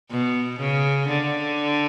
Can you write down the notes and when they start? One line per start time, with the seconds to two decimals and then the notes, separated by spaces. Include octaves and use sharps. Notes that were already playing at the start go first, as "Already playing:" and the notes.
0.10 B2
0.60 C#3
1.08 D3